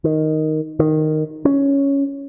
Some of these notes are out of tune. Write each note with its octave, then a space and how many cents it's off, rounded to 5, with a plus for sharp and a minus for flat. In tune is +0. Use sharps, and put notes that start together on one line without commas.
D#3 +0
D#3 -5
C#4 +5